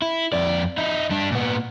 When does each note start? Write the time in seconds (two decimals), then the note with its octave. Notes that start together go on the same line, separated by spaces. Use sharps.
0.02 E4
0.33 F2 D5
0.78 D#4 E4
1.10 G3 D4
1.32 A#2 B3